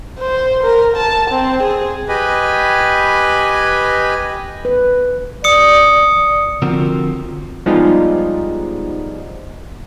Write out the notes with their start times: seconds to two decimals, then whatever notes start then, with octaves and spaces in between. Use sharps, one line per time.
0.19 C5
0.63 A#4
0.97 A5
1.30 C4
1.63 G#4
2.09 G4 B4 D#5 G#5 B5
4.65 B4
5.44 D5 D#6 C#7
6.62 D3 F3 C4 F4 F#4 A#4
7.66 F3 G3 G#3 B3 D#4 F4